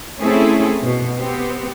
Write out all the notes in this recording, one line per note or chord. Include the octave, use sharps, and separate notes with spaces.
A3 C4 C#4 E4 G#4 A4
B2
B3 C4 G4